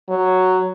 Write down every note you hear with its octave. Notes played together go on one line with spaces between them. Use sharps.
F#3